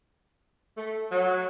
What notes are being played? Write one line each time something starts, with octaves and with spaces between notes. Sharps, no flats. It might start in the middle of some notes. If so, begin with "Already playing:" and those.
A3
F#3